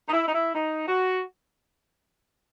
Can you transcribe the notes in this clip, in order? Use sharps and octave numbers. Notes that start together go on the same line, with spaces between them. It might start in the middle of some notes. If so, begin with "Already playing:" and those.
D#4
E4
D#4
E4
D#4
F#4